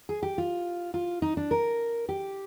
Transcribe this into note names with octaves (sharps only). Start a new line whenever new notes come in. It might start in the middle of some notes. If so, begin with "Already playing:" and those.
G#4
G4
F4
F4
D#4
D4
A#4
G4